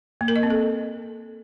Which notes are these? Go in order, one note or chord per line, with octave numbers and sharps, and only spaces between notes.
A#3
A#4
D#5
C4
A4